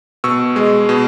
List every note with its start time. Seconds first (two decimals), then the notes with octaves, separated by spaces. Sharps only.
0.24 B2 C#6 E6
0.56 G#3
0.89 B2